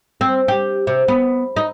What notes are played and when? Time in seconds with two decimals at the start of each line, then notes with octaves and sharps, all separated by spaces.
0.21 C4
0.48 G4
0.87 C3
1.08 B3
1.56 D#4